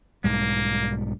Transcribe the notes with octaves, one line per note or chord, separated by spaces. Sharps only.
B1 G#2 G3 A#3